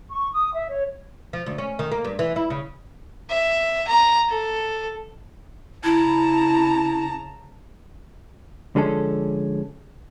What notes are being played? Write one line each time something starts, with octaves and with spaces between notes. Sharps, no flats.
C#6
D#6
E5
C#5
F3
D2
C#4
D#3
A#3
G2
E3
E4
C#3
E5
A#5
A4
C#3 E4 A5 A#5
D3 F3 G#3 C#4 A4